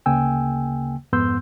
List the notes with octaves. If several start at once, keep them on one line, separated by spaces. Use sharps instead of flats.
D2 C#3 A#3 G5 G#5 E6
F2 G#2 B3 C6 E6 G6